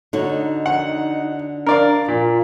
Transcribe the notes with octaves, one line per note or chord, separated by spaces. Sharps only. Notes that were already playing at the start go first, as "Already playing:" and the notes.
D3 D#4 F#4 C#5
F#5
D4 A#4 D5 F5
A#2 F4